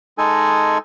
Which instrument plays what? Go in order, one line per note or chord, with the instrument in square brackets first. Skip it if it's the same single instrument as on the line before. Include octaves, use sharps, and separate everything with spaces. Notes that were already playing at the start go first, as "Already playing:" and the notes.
[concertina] G#3 D#4 A4 G#5